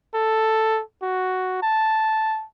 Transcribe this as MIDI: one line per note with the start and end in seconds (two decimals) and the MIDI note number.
0.14 0.81 69
1.02 1.60 66
1.62 2.45 81